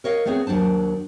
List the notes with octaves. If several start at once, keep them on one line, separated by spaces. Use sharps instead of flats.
A#4 C#5 D#5 F5
A3 B3 C4 G#4 C#5
D#2 F#3 D4 C5 A5